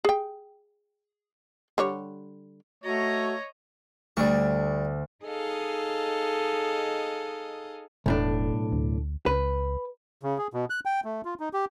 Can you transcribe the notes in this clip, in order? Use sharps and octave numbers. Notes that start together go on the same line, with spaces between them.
G#4 G5
D3 G3 C#5
A3 F#4 C#5 D#5 A#5
D2 D3 G3 C#6
D#4 G#4 A4 D#5 F5
E1 B1 A2 D4
D2
C#2 B4
C#3
G#4
B2
F#6
G5
A3
F4
D#4
G4